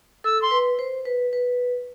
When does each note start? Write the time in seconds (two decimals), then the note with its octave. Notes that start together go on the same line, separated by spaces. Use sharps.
0.24 A4 E6
0.42 C6
0.51 B4
0.79 C5
1.05 B4
1.33 B4